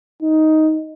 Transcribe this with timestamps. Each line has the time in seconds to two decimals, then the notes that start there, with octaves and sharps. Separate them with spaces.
0.22 D#4